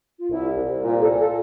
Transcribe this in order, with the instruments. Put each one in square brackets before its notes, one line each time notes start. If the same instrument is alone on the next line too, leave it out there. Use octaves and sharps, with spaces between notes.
[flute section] F4
[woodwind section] C2 [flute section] E4
[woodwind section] C2
[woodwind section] A#2 [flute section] F4
[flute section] A4
[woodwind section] A#2
[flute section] A4